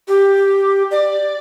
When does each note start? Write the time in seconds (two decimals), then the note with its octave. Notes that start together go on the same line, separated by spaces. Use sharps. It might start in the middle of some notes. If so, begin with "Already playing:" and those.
0.08 G4
0.91 D5